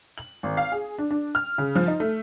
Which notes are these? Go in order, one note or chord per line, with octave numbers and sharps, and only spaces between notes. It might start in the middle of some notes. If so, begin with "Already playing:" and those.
F#7
G#1
F5
G#4
D4
D4
F6
C#3
F3
D#4
A3